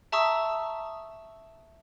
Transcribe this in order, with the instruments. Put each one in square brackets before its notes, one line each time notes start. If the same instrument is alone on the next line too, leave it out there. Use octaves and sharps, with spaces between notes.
[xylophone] E5 A5 A#5 C#6 D#6 E6